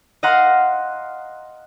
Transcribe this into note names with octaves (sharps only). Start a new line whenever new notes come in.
D#5 F5 F#5 A#5 C6